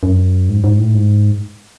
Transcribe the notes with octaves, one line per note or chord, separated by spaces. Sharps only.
F#2
G#2
G#2
A2
G#2